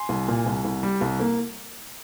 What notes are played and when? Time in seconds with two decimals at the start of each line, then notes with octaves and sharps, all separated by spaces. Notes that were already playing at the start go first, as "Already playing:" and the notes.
Already playing: G#5 C6
0.09 C2
0.28 A#2
0.46 C2
0.65 C2
0.83 G3
1.01 C2
1.20 A#3